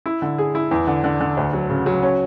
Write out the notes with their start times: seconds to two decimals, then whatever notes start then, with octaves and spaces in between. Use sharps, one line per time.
0.06 E4
0.22 D3
0.38 G#4
0.55 E4
0.71 E2
0.87 D3
1.04 D3
1.20 D3
1.37 D2
1.53 F#3
1.70 C#3
1.86 F#3
2.03 C#4